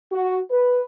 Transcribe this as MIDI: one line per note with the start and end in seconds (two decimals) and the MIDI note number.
0.12 0.37 66
0.51 0.81 71